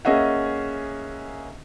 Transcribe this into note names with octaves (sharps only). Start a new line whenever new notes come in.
A#3 C#4 G#4 D#5 E5 F#5